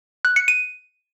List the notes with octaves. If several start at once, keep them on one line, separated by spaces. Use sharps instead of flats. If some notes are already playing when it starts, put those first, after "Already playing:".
F#6
C#7
D#7